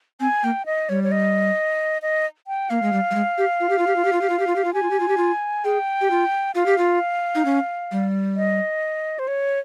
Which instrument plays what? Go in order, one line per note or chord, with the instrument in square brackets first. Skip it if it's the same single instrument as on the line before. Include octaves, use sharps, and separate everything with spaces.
[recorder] C4 [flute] G#5
[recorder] A#3 [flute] G5
[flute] D#5
[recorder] G3 [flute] C#5
[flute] C#5
D#5
D#5
G5
[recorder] A#3 [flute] F5
[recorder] G#3
G3
G3
G#3
G4
F4
G4
F4
G4
F4
G4
F4
G4
F4
G4
F4
G4
F4
[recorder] G4 [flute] G#5
[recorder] F4
G4
F4
G4
F4
[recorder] G#4 [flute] G5
[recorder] G4
F4
[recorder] F4 [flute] F5
[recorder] G4
F4
D#4
C#4
G3
[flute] D#5
C5
C#5